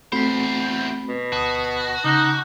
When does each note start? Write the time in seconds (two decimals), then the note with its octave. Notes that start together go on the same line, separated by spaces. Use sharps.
0.12 E2 A3 C4 F#4 C5 B5 B6
1.09 B2
1.32 D2 F#4 A5 D#6
2.04 C#3 D#4 D6 F#6 G6